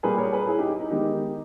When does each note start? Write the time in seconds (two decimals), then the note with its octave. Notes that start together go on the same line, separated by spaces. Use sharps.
0.03 A#2 G3 A#3 G#4 B4
0.18 A#4 C#5
0.32 G#4 B4
0.47 E4 G#4
0.57 D#4 G4
0.69 E4
0.80 D#4
0.90 D#3 G#3 B3 D#4 G4